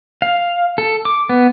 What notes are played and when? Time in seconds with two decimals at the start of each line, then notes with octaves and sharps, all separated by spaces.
0.22 F5
0.78 A4
1.05 D6
1.29 B3